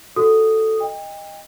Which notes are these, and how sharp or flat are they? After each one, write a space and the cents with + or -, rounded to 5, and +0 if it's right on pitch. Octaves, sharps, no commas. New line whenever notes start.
F#4 +0 A4 +0 D#6 -5
D#5 +0 G5 +35